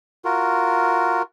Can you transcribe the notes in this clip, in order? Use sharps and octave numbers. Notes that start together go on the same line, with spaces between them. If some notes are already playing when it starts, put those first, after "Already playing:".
F4 F#4 A#4